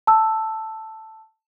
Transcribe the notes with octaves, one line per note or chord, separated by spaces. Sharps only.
A5 E6